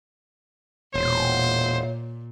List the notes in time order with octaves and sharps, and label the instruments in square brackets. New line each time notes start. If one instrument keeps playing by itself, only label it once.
[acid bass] E1 [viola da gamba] A#2 [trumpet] C5 [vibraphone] C#5